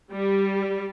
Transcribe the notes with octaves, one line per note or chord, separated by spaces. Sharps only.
G3